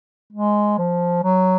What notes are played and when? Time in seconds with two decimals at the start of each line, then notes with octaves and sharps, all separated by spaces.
0.33 G#3
0.78 F3
1.24 F#3